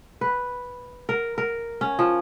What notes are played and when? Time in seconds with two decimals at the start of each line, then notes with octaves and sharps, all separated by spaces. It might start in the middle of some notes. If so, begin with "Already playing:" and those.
0.21 B4
1.09 A#4
1.38 A#4
1.81 C#4
1.99 F3